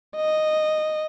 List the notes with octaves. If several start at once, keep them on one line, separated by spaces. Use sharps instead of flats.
D#5